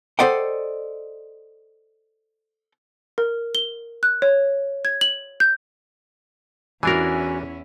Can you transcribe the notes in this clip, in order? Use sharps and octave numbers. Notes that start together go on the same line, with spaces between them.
A4 C5 D5 D#5 F#5 G5
A#4
G7
F#6
C#5
G#6
F#7
G6
E2 E3 C#4 D4 E4 F#4 A#4 G#5